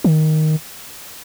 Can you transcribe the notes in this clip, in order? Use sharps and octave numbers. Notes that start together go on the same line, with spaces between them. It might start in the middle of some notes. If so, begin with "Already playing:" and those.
D#3